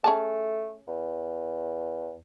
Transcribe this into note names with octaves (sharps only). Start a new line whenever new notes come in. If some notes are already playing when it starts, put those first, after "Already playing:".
A3 C#4 G#4 A5
E2